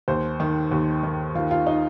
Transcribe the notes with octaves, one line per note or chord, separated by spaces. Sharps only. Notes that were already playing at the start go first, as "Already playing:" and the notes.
D#2 C5
D#3
D#2
D#3
D#3 F4
F4
D#4